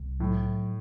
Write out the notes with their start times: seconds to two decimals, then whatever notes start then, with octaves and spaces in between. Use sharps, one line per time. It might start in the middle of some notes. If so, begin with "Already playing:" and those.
Already playing: C2
0.20 A2 F#3